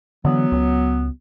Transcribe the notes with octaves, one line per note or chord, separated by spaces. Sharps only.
D3 E3 F#3 B3
C#2